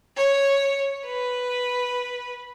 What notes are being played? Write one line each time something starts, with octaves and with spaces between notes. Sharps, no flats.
C#5
B4